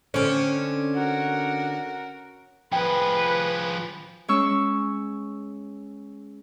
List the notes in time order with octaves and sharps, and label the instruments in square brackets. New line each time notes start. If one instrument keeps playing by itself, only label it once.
[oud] D3 C4 [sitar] C#4
[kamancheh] F#4 A#4
[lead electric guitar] F3 G#4 [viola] B4 [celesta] G5
[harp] G#3 C#4 C#6 E6